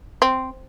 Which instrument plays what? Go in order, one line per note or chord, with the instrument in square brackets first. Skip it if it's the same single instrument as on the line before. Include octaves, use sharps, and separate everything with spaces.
[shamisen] C4